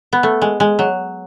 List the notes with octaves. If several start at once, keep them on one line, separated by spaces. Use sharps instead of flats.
B3
A3
G#3
G#3
F#3